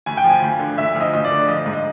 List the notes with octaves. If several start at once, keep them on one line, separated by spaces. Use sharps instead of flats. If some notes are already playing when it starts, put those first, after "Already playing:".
D2 G#5
G5
F3
G#5
D2
D3
D2 E5
F3
D#5
D2 D#5
D5
D3
F3 D#5
G#2
D#5